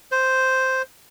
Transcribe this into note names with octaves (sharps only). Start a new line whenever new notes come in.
C5